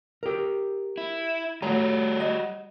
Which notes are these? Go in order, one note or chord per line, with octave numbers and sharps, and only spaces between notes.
G4 A#4
E4
G3 A3 F#4 C#5 A#5
D#5